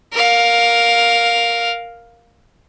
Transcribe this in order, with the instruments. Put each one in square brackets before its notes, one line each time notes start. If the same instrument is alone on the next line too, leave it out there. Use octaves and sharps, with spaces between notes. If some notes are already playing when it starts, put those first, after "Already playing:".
[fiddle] A#4 F5